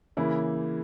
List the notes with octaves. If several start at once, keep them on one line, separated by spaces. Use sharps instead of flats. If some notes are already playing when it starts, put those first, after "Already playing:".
C#3 E3 A#3 E4